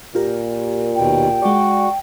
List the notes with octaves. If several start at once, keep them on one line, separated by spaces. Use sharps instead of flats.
A#2 F4 G4 A#4
D#2 B2 G5
G#3 F#4 D5